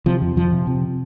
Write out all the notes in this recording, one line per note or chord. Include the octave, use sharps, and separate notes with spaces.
C3 F3
F2
F2 F3
C3
C3